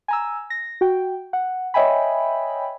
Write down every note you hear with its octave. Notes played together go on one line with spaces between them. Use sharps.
G#5 A#5 E6
A#6
F#4 G5
F#5
C#5 D#5 E5 G5 G#5 B5